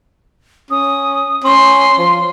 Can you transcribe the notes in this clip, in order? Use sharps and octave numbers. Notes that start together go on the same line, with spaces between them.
C#4 D#6
C#4 C6
F3